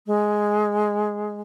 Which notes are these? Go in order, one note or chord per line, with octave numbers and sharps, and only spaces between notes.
G#3